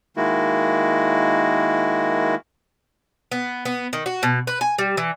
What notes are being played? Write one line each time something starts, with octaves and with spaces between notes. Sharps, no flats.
D#3 G#3 A#3 E4 F#4
B3
B3
D#3
F#4
B2
B4
G#5
G3
E3